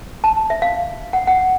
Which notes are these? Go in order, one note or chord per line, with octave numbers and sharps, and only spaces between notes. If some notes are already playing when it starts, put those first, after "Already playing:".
A5
E5
F5
F#5
F#5